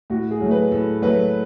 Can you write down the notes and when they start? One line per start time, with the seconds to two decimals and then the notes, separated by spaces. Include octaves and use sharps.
0.10 A2 F#4
0.31 G#4
0.41 F#3 A3
0.51 B4
0.71 A2 A4
1.02 F#3 A3 B4